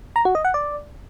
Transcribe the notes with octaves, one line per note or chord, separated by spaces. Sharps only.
A#5
F#4
D#5
F#5
D5